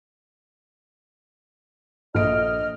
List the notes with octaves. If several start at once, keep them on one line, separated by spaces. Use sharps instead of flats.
A#1 A4 D#5 F6 D7